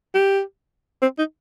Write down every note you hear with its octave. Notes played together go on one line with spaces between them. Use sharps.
G4
C4
D#4